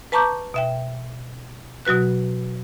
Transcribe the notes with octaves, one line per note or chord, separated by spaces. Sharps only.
B4 A5 A#5 C#6 D6 G6
B2 E5 G5
B2 F#3 F#4 B4 F#6